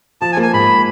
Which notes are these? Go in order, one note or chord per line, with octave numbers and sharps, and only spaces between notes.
F3 A5
G#5
A#3
G#5
G#2 B5